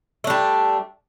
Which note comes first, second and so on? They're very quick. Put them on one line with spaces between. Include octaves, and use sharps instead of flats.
A3 D4 G3